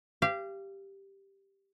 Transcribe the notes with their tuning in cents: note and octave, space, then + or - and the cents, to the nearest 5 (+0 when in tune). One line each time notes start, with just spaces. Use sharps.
G4 +0 F5 -30